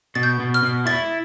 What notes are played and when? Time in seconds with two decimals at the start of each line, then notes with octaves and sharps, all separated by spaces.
0.15 B2 A6
0.23 G6
0.40 B2
0.54 F6
0.63 B2
0.86 E4 A6